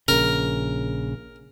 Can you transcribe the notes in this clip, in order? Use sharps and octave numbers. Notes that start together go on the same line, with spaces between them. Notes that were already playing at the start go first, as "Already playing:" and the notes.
A#1 C#3 A#4